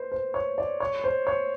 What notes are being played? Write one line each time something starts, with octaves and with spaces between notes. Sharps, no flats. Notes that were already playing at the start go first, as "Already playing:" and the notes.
Already playing: B4 C5
C5
C#5
D5
C#5
C5
C#5